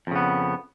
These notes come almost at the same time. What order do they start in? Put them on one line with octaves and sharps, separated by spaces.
F2 C#3 B3